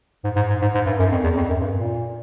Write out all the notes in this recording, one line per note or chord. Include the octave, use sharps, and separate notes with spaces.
G#2
G#2
G#2
G#2
G#2
G2
F#2
F2
E2
F2
F#2
G2
A#2